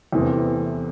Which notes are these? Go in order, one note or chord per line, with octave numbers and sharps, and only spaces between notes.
E2 C3 E3 A3 C4